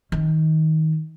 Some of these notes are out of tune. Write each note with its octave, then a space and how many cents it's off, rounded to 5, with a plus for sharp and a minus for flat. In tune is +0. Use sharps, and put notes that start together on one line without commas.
D#3 +20